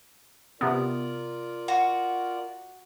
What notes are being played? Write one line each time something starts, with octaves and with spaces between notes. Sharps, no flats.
C3 B3 F4 A#4 D5
F#4